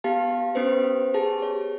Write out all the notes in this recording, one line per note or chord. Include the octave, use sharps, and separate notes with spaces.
B3 G4 F5 A5
B3 C#4 G4 B4 C5
G4 G#4 A5
C#5